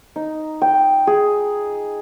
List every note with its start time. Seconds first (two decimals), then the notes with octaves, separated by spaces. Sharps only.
0.16 D#4
0.62 G5
1.07 G#4